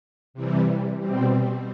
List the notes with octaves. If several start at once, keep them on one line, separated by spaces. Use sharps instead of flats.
C3 E3 G3
B2 G3 C4